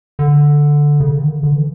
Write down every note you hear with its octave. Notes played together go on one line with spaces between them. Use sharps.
D3
C#3
D3
D#3
D3
D3
E3